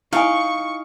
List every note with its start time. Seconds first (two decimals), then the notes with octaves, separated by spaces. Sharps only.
0.13 D#4 E4 F5 G#5 C#6